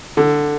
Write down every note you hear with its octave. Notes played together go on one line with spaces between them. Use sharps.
D3